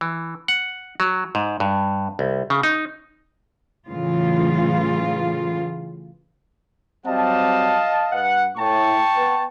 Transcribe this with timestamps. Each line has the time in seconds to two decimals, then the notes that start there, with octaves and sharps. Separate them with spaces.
0.01 E3
0.48 F#5
1.00 F#3
1.35 G#2
1.60 G2
2.19 C2
2.50 C#3
2.63 D#4
3.89 A2 C#3 E3 F#3 F4
7.06 F#3 G3 C4 D#5 F5 A5
8.12 G2 B4 F#5
8.57 A2 G5 A5 C#6
9.16 B3 B4